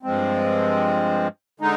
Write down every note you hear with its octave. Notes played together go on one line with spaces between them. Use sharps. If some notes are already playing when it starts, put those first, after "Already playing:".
G2 F3 G#3 C4
D3 G#3 D#4